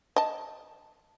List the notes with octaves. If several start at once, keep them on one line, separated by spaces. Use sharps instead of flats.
D#5 A5